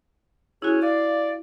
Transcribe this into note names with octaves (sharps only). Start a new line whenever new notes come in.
C#4 E4 F#4 G#4
D5 F5